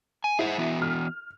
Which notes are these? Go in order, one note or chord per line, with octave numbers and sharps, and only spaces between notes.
G#5
E4 G#4 C5 F#5
E3 B3 F#4
F6